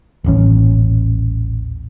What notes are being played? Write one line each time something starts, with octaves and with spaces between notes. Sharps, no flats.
D#1 A1 C#4